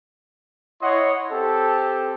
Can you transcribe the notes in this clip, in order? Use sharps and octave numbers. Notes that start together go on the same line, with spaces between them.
E4 C#5 D#5 F#5 C6
C4 G4 A4